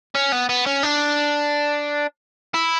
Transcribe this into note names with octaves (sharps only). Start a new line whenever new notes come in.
C#4
B3
B3
C#4
D4
E4